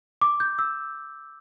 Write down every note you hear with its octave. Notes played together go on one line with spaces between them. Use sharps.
D6
G6
E6